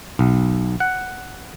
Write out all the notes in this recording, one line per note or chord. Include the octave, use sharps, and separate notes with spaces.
B1
F#5